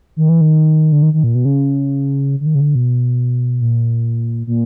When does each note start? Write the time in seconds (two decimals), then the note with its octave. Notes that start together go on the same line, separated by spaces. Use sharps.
0.16 D#3
0.29 E3
0.41 D#3
0.92 D3
1.02 D#3
1.14 D#3
1.24 A#2
1.35 B2
1.45 C#3
2.40 D3
2.46 D#3
2.55 C#3
2.60 D3
2.75 B2
3.61 A#2
4.47 A#2